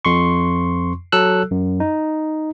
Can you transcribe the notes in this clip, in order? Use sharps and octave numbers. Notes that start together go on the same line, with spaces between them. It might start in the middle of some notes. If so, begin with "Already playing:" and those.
F2 C6 C#6
F#3 A4 E6 F#6
F#2
D#4